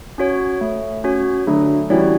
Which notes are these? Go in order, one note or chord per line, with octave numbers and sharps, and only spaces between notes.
C#4 F#4 C#5
A3
C#4 F#4 C#5
D3 F#3 A3
E3 G3 C#4 F#4 C#5